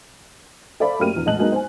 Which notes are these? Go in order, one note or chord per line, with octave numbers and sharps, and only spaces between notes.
A4 C5 D5 E5 F5 B5
F#2 A3 A#3 G4 F6 D#7
A#1 E2
A1 G#3 D#5 A5 F#6 F#7
F#3 G#3 A#3 B3 D#4
C5 G#5